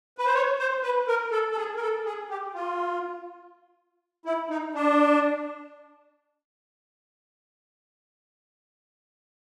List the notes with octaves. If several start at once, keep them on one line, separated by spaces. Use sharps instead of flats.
B4
C5
C#5
C5
B4
A#4
A4
A4
G#4
A#4
A4
G#4
G4
F4
E4
D#4
D4